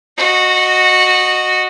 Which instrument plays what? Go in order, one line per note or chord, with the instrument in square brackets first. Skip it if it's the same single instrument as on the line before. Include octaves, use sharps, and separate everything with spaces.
[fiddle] F#4 D#5